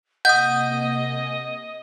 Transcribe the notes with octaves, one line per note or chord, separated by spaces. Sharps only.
C3 A#3 D#5 F#5 G#5 D#6 G6